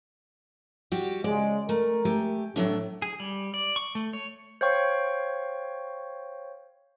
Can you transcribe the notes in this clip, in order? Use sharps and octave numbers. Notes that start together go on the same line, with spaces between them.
G3 F#4 G4
C#3 G#3 D5
A3 A#4
A3 G4 G#5
A2 F#3 A3 D4
G#4
G3
D5
C#6
A3
C#5
C5 C#5 F5 G5 C#6